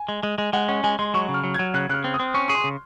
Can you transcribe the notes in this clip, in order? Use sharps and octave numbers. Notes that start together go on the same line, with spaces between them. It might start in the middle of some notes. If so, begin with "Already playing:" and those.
Already playing: G#5
G#3
G#3
G#3
G#3 F#5
C#4 F#5
G#3 G#5
G#3 C6
F#3 C#6
C#3
F6
F#3
F#3 G#6
C#3 F#6
C#3 F6 F#6
C4
D#6
C4
C#4 C#6
G#4 C#6
C6
C#3